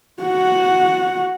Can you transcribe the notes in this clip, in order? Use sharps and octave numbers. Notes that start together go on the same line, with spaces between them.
F#4 F#5